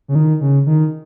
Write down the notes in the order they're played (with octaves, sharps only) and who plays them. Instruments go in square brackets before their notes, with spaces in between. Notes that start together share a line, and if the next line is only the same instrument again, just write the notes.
[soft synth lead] C#3
D#3
C#3
D#3